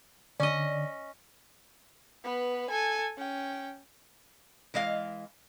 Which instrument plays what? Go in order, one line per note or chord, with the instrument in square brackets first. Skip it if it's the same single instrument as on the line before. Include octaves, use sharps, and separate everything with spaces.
[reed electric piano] D3 [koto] C#4 D#5 [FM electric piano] D5
[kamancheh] B3 B4
A4 G#5
C#4 G5
[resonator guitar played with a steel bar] E3 G#3 D#5 F5